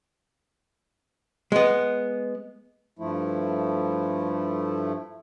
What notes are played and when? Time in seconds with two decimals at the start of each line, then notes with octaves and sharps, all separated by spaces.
1.52 G#3 B3
2.99 G2 F3 A3 E4